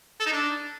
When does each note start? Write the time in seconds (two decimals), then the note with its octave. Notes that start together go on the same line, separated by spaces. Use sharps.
0.20 A4
0.26 D#4
0.33 D4